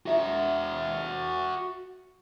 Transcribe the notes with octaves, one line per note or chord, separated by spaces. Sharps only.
F#4 E5